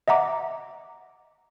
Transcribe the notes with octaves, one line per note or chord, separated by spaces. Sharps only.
D#5 E5 F#5 A#5 D6